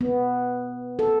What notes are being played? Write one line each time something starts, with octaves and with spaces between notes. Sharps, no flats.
B3
A4